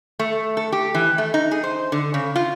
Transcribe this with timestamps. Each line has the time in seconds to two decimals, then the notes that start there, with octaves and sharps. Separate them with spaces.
0.19 A3
0.57 A4
0.72 G4
0.95 E3
1.18 A3
1.34 D#4
1.51 G#4
1.64 C5
1.92 D3
2.14 C#3
2.36 F4